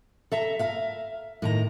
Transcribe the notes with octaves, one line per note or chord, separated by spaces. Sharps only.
A4 E5 A#5
E5 F5 A#5
A2 D#3 A#5